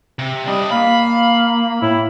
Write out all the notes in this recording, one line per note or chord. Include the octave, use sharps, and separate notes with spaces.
C3
G3 D4 D#5
A#3 F5 B5
A2 E4